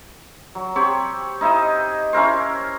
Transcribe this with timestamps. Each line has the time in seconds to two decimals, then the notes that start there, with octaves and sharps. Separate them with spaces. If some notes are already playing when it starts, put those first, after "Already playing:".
0.55 F#3
0.75 C4 G4 C#5 B5
1.41 D#4 E4 C5 D#5
2.13 C#4 E4 A#4 C5